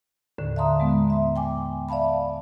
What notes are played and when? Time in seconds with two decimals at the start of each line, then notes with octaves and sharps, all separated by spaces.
0.38 D#2 A2 D3
0.56 E5 F5 A5 A#5 C6 D#6
0.80 G#3 B3
1.10 E5 C6
1.36 G5 G#5 D6
1.89 D5 E5 F5 A5 B5